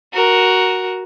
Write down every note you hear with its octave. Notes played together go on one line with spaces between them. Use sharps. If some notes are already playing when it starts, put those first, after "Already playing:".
F#4 A#4